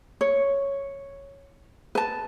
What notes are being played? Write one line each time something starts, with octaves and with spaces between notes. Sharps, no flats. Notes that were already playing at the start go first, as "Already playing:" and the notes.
C#5
B4 A5